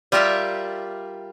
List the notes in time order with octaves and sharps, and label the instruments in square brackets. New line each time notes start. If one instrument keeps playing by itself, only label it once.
[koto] G3 F4 G4 A#4 E5